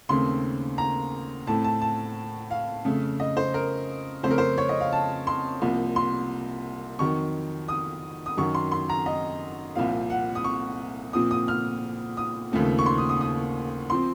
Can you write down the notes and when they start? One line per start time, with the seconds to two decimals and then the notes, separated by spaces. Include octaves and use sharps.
0.09 D#2 C#3 A3 C4 C6
0.78 A#5
1.47 A2 A3 C4 A5
1.64 A5
1.81 A5
2.51 F5
2.85 F2 C#3 A3
3.20 D#5
3.37 C5
3.54 A#4
4.23 F2 C#3 A3 C#4 C5
4.31 A#4
4.38 C5
4.58 C#5
4.69 D#5
4.81 F5
4.93 A5
5.27 C6
5.61 C2 C3 F3 A#3
5.96 C6
6.99 F2 D#3 F#3 C#6
7.68 D#6
8.26 D#6
8.37 F#2 D#3 F#3 C#6
8.54 C6
8.72 C6
8.90 A#5
9.06 D#5
9.76 C2 A#2 F3 C4 F5
10.10 F#5
10.35 D#6
10.44 C#6
11.13 A#2 F3 C4 D#6
11.31 D#6
11.48 F6
12.17 D#6
12.52 D#2 C#3 F3 A3 C4
12.79 C#6
12.86 C6
12.98 D#6
13.09 D#6
13.21 D#6
13.90 F3 C4 C6